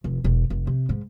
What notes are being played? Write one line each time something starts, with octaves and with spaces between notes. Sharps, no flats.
F1
E1
F1
C3
G#2